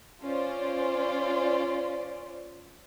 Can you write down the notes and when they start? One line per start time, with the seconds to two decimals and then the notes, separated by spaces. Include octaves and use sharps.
0.23 C#4 F4 C5 D5